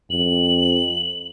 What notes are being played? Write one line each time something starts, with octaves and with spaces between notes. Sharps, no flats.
F2 F#7